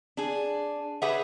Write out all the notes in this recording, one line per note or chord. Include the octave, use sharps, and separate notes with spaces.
D4 G#4
G4 G#4 B4 C#5 E5 F#5